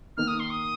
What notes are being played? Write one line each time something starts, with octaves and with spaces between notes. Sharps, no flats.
D#3 A#3 D#4 F6
D#6
C6
D#6